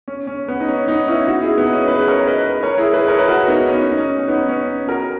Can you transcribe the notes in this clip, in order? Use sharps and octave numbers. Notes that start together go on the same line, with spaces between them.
C#4
C#4
B3
D#4
C#4
B3 D#4
C#4 E4
D#4 F#4
E4 G#4
B3 D#4
C#4
G#4 B4
A#4 C#5
B4 D#5
A#4 C#5
E4 G#4
G#4 B4
A#4 C#5
B4
F#4 A#4
B3 D#4
C#4
D#4
C#4
C#4
B3 D#4
C#4
F#4 A#4